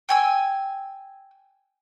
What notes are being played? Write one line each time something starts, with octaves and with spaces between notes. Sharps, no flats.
G5 G#5 E6